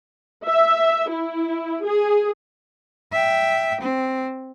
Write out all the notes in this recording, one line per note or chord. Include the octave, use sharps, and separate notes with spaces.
E5
E4
G#4
E5 G5
C4